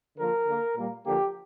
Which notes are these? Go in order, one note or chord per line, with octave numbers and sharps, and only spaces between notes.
D3 F3 A#3 A#4
D3 A#3
A#2 G3 A#3
D3 F3 A#3 G4